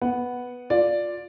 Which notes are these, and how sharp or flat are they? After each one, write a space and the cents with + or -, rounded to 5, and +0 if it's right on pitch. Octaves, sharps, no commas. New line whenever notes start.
B3 +0 F#5 +0
F4 +15 D5 +0